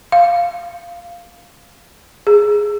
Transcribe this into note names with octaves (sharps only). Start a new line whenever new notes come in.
F5
G#4